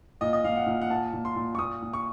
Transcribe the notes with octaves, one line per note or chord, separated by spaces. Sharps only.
A#2 D#5
D#5
A#2 F5
F#5
A#2
F#5
A#2 A5
A#2
C6
A#2
C#6
A#2 D#6
A#2
C#6